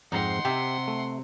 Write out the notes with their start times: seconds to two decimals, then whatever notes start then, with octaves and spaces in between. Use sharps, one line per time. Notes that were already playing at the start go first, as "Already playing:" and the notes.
0.12 F2 G#2 C4 D#4 F#5 C6
0.45 C3 G4 E5
0.88 A3